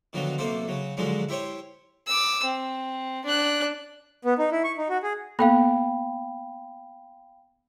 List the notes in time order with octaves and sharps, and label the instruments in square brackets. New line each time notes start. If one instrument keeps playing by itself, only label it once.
[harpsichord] B2 D3 D#3 F3 F#3
B1 C3 A#3 A4 C5
C#3 F#3
G#2 D3 F3 F#3 G#3 D#4
E4 G4 C5 C#5
[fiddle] D6 E6
C4
D4 F#6
[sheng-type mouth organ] B3
D#4
E4
C#6
D#4
F#4
G#4
[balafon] A#3 B3 A4 [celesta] F5 G5 B5